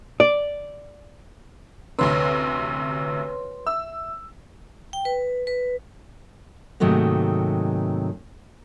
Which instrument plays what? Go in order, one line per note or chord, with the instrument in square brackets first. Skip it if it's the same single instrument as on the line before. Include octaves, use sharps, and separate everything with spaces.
[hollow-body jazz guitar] D5
[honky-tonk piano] A1 D2 C3 [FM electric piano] B4 C#5 C6
[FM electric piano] E5 [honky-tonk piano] E6
[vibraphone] G5
B4
B4
[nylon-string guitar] G#2 C3 D#3 F#3 A3 A#3